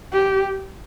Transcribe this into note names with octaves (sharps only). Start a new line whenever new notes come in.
G4